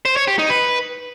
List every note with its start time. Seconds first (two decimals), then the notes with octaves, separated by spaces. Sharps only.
0.05 C5
0.17 C#5
0.28 G4
0.39 D#4
0.50 B4